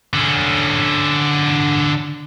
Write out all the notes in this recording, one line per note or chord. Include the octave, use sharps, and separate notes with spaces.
D3 C#4